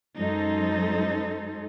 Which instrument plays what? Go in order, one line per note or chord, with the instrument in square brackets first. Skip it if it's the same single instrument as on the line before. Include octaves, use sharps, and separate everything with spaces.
[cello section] F#2 G#3 D#4 A4 C5